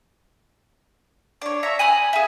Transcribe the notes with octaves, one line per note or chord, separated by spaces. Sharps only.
D4 C#5
C#5 E5 A#5
G#5 B5 D#6 F#6
G#4 E5